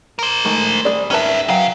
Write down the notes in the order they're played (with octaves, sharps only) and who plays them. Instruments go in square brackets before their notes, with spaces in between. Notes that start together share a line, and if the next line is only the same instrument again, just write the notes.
[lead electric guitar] A#4 C5
[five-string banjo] D#3 G#3 A3
G3 G#4 D5
[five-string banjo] D#3 B4 A5 [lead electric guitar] C#4 E5
[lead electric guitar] C#3 F5 [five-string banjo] F#3 G5